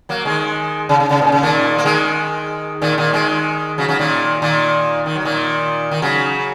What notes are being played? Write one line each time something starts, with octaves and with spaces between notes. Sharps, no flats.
F#3 A#3
D#3 G#3
C#3
C#3
C#3
A#2
C#3
A#2 D#3
A#3
D#3 G#3
A#2 D#3
A#2 D#3
D#3 G#3
C#3 F#3
C#3 F#3
A#2 D#3
A#2 D#3
D#3
F#3
A#2 D#3
D#3
C#3 F#3